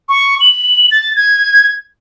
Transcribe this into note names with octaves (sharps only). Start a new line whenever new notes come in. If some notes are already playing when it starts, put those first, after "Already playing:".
C#6
F#7
A6
G#6